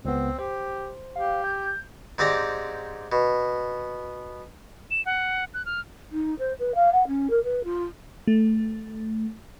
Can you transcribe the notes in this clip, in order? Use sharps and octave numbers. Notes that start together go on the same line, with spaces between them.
C#2 B3 C4
G4 C5
G4 F5
G6
G#2 C4 G4 D5 A#5
B2
E7
F#5
F#6
F6
D#4
C5
B4
F5
F#5
C#4
A#4
B4
F4
A3